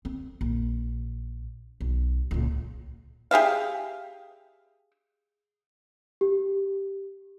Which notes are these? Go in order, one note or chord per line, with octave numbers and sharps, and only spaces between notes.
C4
A#1
B1
C#2 A#2
G4 G#4 E5 F5
G4